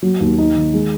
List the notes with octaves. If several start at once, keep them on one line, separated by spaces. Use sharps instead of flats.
F#3
D#2
D#4
D#3
G#3